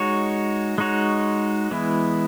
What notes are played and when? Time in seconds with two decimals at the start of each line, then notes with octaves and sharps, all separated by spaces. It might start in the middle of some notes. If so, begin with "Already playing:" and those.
Already playing: G#3 D#4 F#4 C#5
0.78 G#3 D#4 F#4 C#5
1.71 E3 G#3 B3 E4